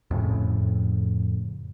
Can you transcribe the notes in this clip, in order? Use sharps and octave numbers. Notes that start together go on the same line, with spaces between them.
F2 A2 C#3